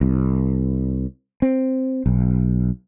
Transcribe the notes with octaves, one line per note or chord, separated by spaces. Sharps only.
C2
C4
B1